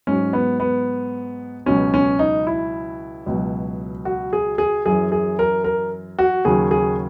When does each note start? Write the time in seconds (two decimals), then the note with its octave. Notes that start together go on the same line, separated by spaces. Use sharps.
0.07 G#2 F#3 C#4
0.33 B3
0.60 B3
1.66 C#2 B2 F#3 C#4
1.94 C#4
2.19 D#4
2.47 E4
3.26 C#2 B2 F#3
4.05 F#4
4.33 G#4
4.58 G#4
4.86 F#2 E3 G#4
5.12 G#4
5.39 A#4
5.64 A#4
6.19 F#4
6.45 D#2 C#3 F#3 G#4
6.71 G#4